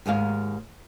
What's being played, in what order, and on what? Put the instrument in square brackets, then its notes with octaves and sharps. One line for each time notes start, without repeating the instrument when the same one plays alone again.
[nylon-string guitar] D#2 G#2 G#4 F5